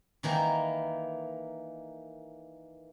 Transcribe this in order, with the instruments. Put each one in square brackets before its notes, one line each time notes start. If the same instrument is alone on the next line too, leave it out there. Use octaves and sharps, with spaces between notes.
[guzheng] D#3 E3 A#3